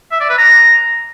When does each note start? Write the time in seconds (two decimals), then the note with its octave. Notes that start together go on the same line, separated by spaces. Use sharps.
0.12 E5
0.21 D5
0.29 B4
0.38 A#5